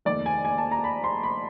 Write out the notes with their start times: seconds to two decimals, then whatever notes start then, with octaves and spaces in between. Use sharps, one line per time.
0.05 F1 D#2 D#3 D5
0.26 G#5
0.45 G#5
0.58 A5
0.71 A#5
0.84 B5
1.04 C6
1.23 B5